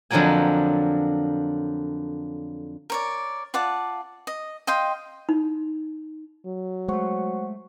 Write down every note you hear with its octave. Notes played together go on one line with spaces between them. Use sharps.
F2 D3 F3 F#3 A#3 G#5
A#4 C#5 D5
F4 D5 F#5 A5
D#5
D#5 F5 G5 C6
D#4
F#3
G#3 A3 C5 F#5 C#6